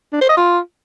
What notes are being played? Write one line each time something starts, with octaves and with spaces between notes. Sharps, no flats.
D4
C5
D#5
F4